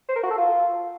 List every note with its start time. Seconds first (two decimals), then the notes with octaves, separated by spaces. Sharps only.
0.09 C5
0.16 A#4
0.23 F#4
0.30 A4
0.38 F4